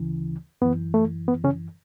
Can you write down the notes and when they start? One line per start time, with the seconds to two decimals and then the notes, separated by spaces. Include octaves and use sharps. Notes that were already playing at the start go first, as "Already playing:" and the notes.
Already playing: D2 C#3 E3
0.62 F#2 E3 B3
0.94 A3
1.28 B3
1.44 C#3 C#4